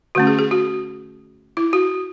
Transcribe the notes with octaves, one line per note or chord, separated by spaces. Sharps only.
D3 A3 C#4 F#4
G#4
G#4
F#4
E4
F#4